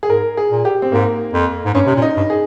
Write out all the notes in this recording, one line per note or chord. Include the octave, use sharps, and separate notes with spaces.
G#4
G#2 A#4
G#4
A#2
G4
C4
G#2 A#3
F2
G#2
G2 C#4
C3
A#2
D#4
G2
G#4